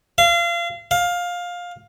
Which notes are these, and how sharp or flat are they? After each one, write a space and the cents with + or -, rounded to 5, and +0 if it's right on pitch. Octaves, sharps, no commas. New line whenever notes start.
F5 -30
F5 +15